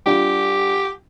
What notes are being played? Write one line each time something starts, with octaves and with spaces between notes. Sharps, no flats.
G3 D4 F4 G4